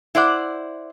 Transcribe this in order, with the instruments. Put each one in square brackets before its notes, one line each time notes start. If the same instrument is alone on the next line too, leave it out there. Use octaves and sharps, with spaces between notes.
[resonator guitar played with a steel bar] E4 C5 D5 F#5